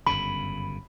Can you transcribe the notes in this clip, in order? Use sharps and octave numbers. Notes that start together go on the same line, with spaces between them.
G1 F#2 C#3 B5